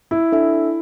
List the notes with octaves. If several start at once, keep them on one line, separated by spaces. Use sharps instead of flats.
E4
D4 A4 E5